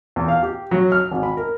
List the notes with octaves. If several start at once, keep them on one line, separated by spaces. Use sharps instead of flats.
E2
F5
G4
F#3
F6
G#1
B5
A#4